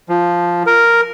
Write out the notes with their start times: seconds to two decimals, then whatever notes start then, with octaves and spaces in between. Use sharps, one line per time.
0.09 F3
0.66 A#4